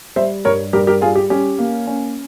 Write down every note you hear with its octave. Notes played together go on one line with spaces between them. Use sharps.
G3 C5 E5
G2 A#4 C#5
G2 G4 A#4
G4 A#4
G3 F4 G#4
G4
C#4 G4
A#3
C#4